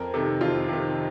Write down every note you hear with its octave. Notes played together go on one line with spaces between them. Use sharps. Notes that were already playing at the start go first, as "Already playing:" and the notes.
Already playing: F2 A#4
C3 D#3 A4
F2 F4
C3 D#3